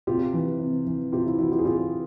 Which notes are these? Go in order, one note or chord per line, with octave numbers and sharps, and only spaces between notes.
C3 F4 G4
E3
C3
E3
C3 F4 G4
E4
E3 E4 F#4
F4 G4
G#4
C3 F4 G4